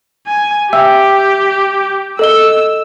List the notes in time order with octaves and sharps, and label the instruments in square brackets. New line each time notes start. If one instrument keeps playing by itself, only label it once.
[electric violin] G#5
[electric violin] G4 [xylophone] E5 G5 E6
[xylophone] A4 D#5 G7 [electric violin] E6